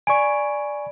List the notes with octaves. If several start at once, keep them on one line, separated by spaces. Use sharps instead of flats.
D5 G#5 B5 C#6 D7